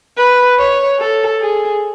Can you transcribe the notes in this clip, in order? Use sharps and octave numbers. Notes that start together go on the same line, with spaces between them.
B4
C#5
A4
G#4